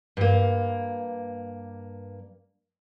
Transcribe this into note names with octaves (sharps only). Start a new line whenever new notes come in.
G2 A#3